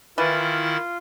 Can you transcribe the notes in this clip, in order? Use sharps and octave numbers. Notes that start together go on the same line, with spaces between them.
D#3 E3 E4 F4 A6